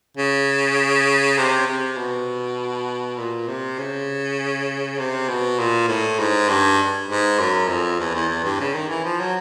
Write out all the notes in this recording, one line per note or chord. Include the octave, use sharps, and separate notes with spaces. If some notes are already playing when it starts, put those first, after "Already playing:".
C#3
C3
C3
B2
A#2
C3
C#3
C3
B2
A#2
A2
G#2
G2
G#2
F#2
F2
E2
E2
E2
G2
C#3
D#3
E3
F3
F#3